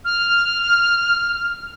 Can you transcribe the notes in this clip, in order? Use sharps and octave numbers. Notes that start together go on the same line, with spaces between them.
F6